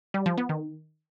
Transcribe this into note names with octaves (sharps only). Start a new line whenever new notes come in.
G3
F3
B3
D#3